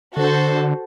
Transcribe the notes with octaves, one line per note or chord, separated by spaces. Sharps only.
D3 F#4 A4 C5